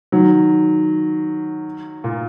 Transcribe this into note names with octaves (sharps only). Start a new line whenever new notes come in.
D#3 F#3
A#2